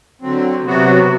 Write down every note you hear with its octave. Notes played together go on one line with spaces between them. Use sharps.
D3 F#3 C4
C3 F#3 B3 F#4